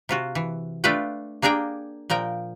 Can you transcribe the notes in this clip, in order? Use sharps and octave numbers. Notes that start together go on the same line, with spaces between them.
C3 F4 F#4
E3
A3 D4 F4 B4 D5 G5
A#3 D4 G#4 A#4 G5
A#2 F3 A#4 G5